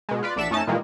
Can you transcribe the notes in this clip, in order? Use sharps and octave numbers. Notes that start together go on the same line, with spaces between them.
B2 G#3
F4 B4 D5
A#1 D4 D5 E5 F#5 E7
F2 A3 C#4 D#4 A5
A#2 D#3 E3 G3 G#3 A#3